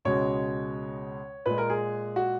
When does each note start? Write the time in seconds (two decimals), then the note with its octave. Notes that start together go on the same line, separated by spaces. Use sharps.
0.05 C#2 B2 G#3 C#5
1.46 A#2 G#3 B4
1.58 A#4
1.70 G#4
2.16 F#4